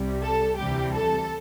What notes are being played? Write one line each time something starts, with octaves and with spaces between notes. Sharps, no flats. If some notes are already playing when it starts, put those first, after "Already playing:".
Already playing: C2 C3 G3
A4
D2 C3 E3 G3 G4
A4